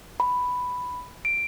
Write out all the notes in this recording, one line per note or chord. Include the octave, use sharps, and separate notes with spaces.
B5
D7